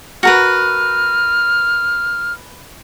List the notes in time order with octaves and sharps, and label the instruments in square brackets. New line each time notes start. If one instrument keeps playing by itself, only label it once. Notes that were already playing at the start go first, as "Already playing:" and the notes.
[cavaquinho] F#4 A#4 B4 [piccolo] F6